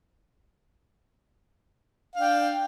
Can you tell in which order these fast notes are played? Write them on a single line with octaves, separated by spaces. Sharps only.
F5 D4 G5